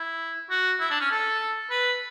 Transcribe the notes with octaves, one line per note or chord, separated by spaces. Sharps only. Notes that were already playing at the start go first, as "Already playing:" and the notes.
Already playing: E4
F#4
E4
D4
C#4
A4
B4